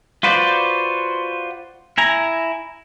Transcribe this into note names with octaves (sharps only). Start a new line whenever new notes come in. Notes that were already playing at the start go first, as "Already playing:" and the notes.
F4 F#4 B4 C5 D5
E4 G#5 A#5